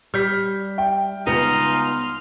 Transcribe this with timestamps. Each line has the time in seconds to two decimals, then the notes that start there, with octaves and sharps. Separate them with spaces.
0.14 G3 F6 G6 B6
0.78 E5 G5
1.27 C#2 B3 D#4 C6 F6